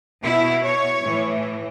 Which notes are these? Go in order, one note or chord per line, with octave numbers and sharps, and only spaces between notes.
B2 E4
C#5
A2 E3